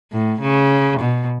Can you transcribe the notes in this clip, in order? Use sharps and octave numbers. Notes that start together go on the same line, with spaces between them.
A2
C#3
B2